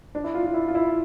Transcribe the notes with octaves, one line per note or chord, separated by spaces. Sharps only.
D4
E4
F4
F4
E4
F4
E4